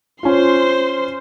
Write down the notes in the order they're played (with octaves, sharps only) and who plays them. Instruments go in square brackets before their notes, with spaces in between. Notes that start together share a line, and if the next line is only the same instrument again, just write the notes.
[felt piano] C#4 F4 [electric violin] C5 C6